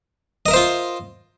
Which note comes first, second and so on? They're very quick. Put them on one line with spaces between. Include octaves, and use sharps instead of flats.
D#5 A#4 E5 C5 F4